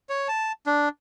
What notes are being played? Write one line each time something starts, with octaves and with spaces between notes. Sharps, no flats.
C#5
A5
D4